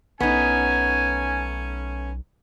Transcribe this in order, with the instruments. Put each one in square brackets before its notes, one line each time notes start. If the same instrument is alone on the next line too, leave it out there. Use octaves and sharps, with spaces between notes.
[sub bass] B1 [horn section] A3 C#4 [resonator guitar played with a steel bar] B3 D#4 [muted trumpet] G#5